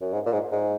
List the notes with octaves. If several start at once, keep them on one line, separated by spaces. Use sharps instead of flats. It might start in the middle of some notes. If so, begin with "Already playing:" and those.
F#2
G#2
A#2
G#2
G#2